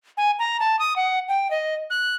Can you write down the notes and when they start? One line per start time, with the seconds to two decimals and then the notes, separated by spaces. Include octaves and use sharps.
0.17 G#5
0.39 A#5
0.60 A5
0.79 D#6
0.96 F#5
1.28 G5
1.51 D#5
1.90 F#6